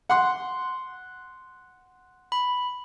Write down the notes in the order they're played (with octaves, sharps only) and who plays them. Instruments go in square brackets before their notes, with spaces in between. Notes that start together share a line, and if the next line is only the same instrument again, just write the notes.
[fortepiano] F#5 C6
[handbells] B5